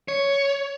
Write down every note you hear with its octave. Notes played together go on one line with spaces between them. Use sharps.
C#5